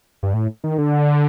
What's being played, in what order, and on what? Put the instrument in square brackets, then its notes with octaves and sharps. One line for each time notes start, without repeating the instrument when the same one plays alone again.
[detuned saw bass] G2
A2
D#3
D3